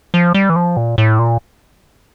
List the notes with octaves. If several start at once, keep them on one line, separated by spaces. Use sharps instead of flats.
F3
G3
E3
F3
A#2
A2
A#2